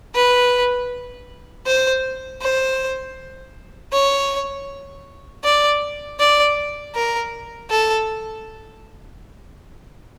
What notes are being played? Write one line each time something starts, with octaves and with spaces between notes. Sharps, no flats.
B4
C5
C5
C#5
D5
D5
A#4
A4